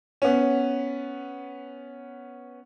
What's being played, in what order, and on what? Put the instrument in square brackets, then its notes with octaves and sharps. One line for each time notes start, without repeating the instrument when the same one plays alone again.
[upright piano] B3 C#4